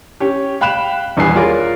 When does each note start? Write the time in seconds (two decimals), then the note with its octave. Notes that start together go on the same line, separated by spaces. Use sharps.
0.20 C#4 G4
0.61 F5 G5 B5 F#6 E7 F7
1.17 D#1 E2 G3 B4 G#5 C7
1.36 F4 G#4 A#4 C#5 D5